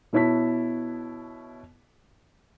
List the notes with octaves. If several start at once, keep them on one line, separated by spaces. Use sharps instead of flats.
B2 B3 E4 C#5 A5 B6